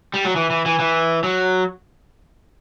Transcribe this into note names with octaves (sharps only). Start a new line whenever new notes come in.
G3
F#3
E3
E3
E3
E3
F#3